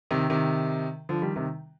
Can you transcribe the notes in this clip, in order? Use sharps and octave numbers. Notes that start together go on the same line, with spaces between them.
C3 D#3
C3 D#3
D3 F3
D#3 G3
C3 D#3